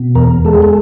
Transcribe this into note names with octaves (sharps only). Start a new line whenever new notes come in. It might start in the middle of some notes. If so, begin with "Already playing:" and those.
Already playing: B2
E2 A#4
G#3 A4
G#4
A4